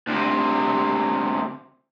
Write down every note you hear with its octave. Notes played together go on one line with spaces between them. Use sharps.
D2 C3